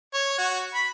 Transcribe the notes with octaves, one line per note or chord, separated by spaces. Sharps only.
C#5
F#4
B5